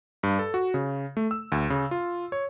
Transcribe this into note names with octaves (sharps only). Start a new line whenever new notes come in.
G2
A4
F#4
C#3
A3
E6
D2
C#3
F4
C#5